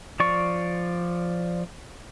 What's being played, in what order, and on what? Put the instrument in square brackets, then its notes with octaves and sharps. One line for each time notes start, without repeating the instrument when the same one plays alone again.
[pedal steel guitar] F3 D5 C#6